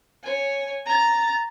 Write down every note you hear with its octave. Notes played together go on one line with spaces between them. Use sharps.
C#5 G#5
A#5 A6